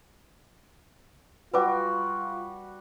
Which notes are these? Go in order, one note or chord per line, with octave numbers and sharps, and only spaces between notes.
G3 F4 F#4 B4 G#5 D6